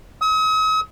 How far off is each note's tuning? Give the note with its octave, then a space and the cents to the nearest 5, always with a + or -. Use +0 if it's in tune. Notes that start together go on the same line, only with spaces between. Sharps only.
D#6 +45